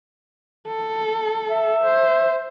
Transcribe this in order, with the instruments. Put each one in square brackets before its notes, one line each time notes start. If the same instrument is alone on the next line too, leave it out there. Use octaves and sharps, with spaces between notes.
[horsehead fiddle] A4
[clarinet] E5
[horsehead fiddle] C5